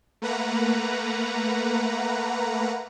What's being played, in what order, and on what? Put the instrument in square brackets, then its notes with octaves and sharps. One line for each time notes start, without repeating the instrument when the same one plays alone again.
[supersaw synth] A3 A#3 B4 F#5 A#5